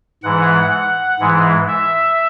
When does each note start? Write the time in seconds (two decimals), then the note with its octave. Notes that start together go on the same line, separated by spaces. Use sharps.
0.23 G#2 E3 G#3 F#5
1.20 G#2 E3 G#3
1.68 E5